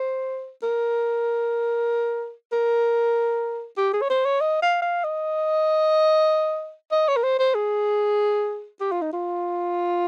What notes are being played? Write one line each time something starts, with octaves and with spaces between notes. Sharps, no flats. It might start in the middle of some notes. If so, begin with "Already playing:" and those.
Already playing: C5
A#4
A#4
G4
G#4
C#5
C5
C#5
D#5
F5
F5
D#5
D#5
C#5
A#4
C5
C5
G#4
G4
F4
D#4
F4